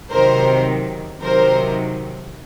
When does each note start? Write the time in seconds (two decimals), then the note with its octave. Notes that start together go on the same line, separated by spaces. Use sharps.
0.11 C3 D#3 F#3 A#4 C5
1.21 C3 D#3 F#3 A#4 C5